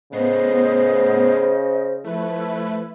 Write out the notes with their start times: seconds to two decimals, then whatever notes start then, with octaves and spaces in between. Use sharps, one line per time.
0.12 A2 C#3 B3 C5 D#5 C7
2.04 F3 A3 E4 B4